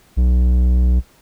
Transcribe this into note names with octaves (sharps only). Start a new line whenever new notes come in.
B1